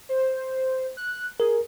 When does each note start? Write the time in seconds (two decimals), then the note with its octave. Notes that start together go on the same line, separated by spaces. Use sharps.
0.09 C5
0.97 F#6
1.40 G#4 A#4